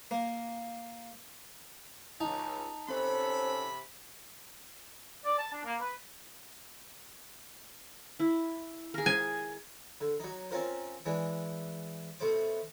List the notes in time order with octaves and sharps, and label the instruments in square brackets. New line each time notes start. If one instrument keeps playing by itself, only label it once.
[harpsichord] A#3
[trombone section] C#2 [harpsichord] D#4 [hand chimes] A5
[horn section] C3 B5 [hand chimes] C4 C5 [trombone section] C#4 A4
[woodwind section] D5
A5
D4
A#3
B4
[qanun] E4
G#4 A#4
[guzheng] G#5
[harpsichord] D3
F#3 D#4
C4 C#4 F4 A#4 C5
E3 G#3 D4
B2 A3 C5 D6